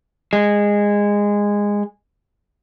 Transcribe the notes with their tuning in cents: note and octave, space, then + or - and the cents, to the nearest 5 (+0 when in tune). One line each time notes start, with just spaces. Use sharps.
G#3 -15